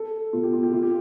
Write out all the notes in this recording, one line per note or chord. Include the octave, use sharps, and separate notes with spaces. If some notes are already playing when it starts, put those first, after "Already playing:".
Already playing: A4
B2 F4
G4
F4
G4
C3 F4
G4